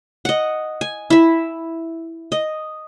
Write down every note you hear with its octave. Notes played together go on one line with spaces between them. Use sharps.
D#5 F#5
G#5
E4 E5
D#5